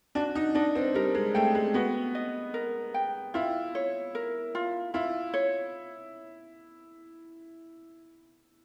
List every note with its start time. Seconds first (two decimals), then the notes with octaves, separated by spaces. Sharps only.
0.15 D4 F#4
0.35 D#4
0.55 D4 D#5
0.75 C4
0.94 G3 A#4
1.15 G#3
1.34 A3 G5
1.55 G#3
1.74 B3 F#4
2.15 D#5
2.54 A#4
2.94 G5
3.34 E4 F4
3.75 C#5
4.15 A#4
4.55 F4
4.94 E4 F4
5.34 C#5